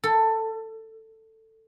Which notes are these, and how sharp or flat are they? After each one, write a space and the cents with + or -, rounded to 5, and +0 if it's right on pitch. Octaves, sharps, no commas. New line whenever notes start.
A4 +15